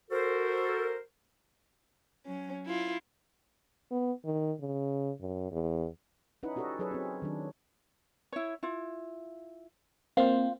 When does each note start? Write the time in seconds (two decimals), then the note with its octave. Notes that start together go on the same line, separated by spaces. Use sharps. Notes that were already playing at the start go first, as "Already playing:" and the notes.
0.11 F#4 A4 A#4 C5
2.25 F#3 C#4
2.67 E4 F4
3.91 B3
4.25 D#3
4.60 C#3
5.20 F#2
5.52 E2
6.43 C#4 D#4 E4 B4 F#5
6.56 C#4 F#4 G4 A4 D5 D#5
6.79 F#3 G#4 A4 B4 C#5
6.91 C4 C#4
7.22 D#3 F#3 D4
8.32 E4 C#5
8.63 E4 F4
10.17 A#3 C4 F4 C5 F5